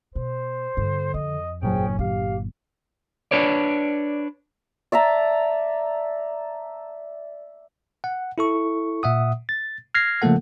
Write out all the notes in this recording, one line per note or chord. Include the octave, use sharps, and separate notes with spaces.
B2 C5
G2 D3
F2 D#5
G1 A#2 F#3 C#4 G#4 C5 G5
D3 G4 F5
D4 B4 C#5 D5
D5 E5 A5 A#5
F#5
E4 A4 C#6
A#2 E5 F#5 D#6
A6
F6 G#6 A#6 C7
C#3 F3 A3 A#3 A4 F#5